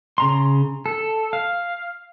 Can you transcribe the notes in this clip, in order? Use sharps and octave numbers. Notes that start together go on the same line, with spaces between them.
C#3 A#5 C6
A4
F5